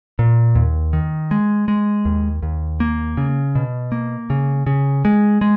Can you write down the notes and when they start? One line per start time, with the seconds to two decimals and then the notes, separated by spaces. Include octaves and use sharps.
0.19 A#2
0.55 D#2
0.93 D#3
1.31 G#3
1.68 G#3
2.05 D#2
2.43 D#2
2.80 A#3
3.17 C#3
3.55 B2
3.92 A#3
4.30 C#3
4.66 C#3
5.05 G#3
5.41 G#3